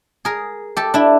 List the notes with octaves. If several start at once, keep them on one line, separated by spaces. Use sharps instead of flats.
G#4 A#4
G4 A4
D4 E4